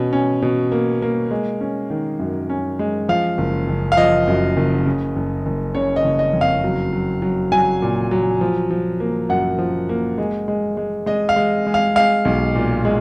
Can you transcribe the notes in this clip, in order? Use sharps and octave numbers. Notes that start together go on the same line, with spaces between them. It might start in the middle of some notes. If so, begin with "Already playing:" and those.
Already playing: B2 C#4
C#4
B2
A#3
A#3
G#3
C#4
D#3
F#2
C#4
G#3
F3 F5
F#1
F#1
F5
F3 D#5
F#2
F#1
C#3
F#1
F#1
C#3 C#5
D#5
F#1
D#5
F2
F5
F#3
F#3
F#3
F#3 G#5
A#2
F#3
F3
F3
A#3
F#2 F#5
F3
A#3
G#3
G#3
G#3
G#3 D#5
F5
G#3
G#3
F5
G#3 F5
B1
A#2
G#3